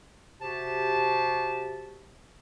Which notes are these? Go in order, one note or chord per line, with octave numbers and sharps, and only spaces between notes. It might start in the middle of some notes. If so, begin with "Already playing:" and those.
C3 F#4 G4 C5 A5